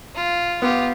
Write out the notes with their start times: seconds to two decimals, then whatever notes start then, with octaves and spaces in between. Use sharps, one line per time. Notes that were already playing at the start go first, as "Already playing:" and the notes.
0.15 F4
0.62 B3 F4 G4